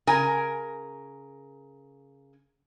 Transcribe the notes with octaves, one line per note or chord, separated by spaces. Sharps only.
C#3 A#4 G#5